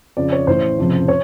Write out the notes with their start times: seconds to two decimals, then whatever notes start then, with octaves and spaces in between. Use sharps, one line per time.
0.17 F2 C#3 F3 D5
0.32 C#5
0.47 A1 A2 E3 C5
0.78 F1 F2 C#3
1.08 C#5